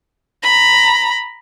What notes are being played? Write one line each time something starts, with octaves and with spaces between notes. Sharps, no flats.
A#5 B5